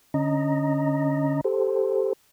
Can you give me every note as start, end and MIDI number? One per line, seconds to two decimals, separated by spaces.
0.14 1.41 50
0.14 1.41 61
0.14 1.41 75
0.14 1.41 82
1.44 2.13 67
1.44 2.13 69
1.44 2.13 72